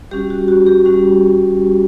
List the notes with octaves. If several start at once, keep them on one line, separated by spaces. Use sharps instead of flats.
G3 C#4 F#4 G4
F#4
F#4
G4
G3 C#4 F#4